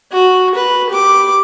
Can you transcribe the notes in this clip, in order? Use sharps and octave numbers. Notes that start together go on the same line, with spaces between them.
F#4
B4
G4 D6